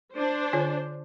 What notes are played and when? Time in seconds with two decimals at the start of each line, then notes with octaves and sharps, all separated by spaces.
0.15 D4 C5
0.53 D3 F4 C#5